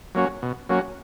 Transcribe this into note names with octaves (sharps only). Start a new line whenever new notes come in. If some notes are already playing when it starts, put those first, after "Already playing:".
F#3 A#3 C#4 F#4
B2
F#3 A#3 C#4 F#4